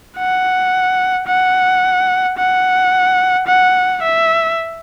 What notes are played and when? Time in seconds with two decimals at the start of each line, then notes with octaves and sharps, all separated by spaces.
0.17 F#5
1.27 F#5
2.38 F#5
3.47 F#5
4.02 E5